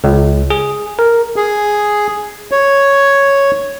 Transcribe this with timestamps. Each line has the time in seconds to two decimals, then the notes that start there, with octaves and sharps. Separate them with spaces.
0.04 C#2
0.50 G#4
0.99 A#4
1.36 G#4
2.52 C#5